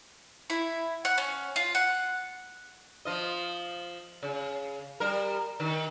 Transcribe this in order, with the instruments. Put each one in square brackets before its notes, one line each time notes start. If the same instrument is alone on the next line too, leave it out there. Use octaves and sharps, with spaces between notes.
[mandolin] E4
F#5
C#4
F4
F#5
[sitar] F3 F4 D#5
C#3
G3 A#4
D#3